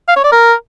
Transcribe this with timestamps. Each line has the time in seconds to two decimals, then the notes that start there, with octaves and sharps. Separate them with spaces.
0.08 F5
0.16 C#5
0.24 D5
0.32 A#4